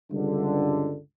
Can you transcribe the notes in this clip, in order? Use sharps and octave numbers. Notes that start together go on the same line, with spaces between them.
C#2 G2 D3